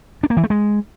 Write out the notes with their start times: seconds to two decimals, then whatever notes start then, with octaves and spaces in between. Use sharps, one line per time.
0.23 D4
0.30 A#3
0.37 E3
0.43 A3
0.50 G#3